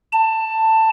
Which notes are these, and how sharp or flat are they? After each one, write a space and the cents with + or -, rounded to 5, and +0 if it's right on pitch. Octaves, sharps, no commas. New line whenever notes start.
A5 +15